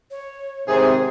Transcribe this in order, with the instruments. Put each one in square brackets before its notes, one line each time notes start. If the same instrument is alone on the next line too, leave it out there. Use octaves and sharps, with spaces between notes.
[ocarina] C#5
[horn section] G#2 D#3 G#4 [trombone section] C3 [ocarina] C5